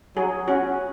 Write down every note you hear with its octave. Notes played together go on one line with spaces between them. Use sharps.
F#3 G#4
C#4 F#4